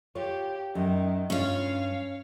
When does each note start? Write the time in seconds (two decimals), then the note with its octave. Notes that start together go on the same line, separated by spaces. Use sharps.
0.15 F4 G4 C#5
0.75 F#2 D#3
1.30 G2 C#4 F4 C#5 F5